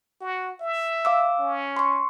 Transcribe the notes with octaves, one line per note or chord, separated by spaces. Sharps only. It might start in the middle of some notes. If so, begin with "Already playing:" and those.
F#4
E5
F5 D6 E6
C#4
C6 C#6